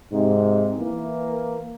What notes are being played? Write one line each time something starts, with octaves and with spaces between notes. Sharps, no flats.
G#2 C3
E3 A#3